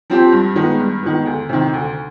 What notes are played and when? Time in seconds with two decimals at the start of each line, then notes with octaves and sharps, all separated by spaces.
0.10 F3 C4 G4
0.32 G2
0.55 D#3 G#3 B3
0.80 G2
1.03 D#3 G#3 B3
1.25 D2
1.49 C3 D#3
1.73 D2